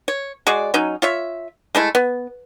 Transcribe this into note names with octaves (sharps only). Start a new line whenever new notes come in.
C#5
G#3 F#4 G#4 D5
F#3 C#4 D#4
F4 C#5 E5
G#3 A3 E4
B3